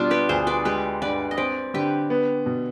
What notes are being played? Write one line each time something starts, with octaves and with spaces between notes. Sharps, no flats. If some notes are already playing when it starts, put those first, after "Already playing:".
Already playing: B2 G3 D4 F4
G4 B4
D2 G#4 C5
B4 D5
G#3 G4 B4
G2 B4 D5
D#5
C4 B4 D5
D3 G4 B4
B3
B2